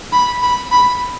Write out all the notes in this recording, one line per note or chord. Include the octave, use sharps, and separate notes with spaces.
B5
B5
B5